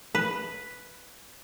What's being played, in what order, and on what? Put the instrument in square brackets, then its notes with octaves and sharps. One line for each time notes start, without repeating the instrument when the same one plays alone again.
[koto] B4